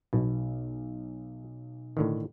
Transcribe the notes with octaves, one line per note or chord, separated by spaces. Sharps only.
B1 B2
A2 D3 D#3